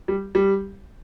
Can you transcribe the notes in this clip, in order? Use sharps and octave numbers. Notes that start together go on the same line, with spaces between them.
G3
G3